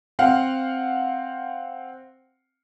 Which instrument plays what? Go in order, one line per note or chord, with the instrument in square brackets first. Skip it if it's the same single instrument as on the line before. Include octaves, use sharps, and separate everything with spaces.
[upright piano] C4 F5 F#5